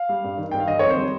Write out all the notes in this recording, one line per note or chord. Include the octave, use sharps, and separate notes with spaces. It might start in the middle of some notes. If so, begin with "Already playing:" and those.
Already playing: F5
G3
G2
D#3
G2 G5
F5
D#3 D#5
F2 C#5
C5
G3